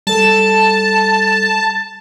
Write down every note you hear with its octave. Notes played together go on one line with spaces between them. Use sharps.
G3 A4 A5